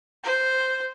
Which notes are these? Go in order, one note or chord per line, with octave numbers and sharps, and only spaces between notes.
C5